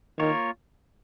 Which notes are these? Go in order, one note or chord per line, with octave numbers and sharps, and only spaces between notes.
D#3 A#3 F4 A#4 C#5